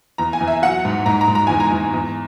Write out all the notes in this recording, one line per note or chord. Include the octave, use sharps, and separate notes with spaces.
E2 A#5
G#5
E2
E5
F#3 F#5
G#2
G#2 A#5
A#5
G#2
A#5
E2 G#5
A#5
E2
E2